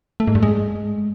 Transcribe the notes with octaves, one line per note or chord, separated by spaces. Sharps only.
A3
G#2
G2
G#3